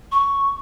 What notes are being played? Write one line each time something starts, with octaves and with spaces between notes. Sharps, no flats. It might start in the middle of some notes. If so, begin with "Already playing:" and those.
C#6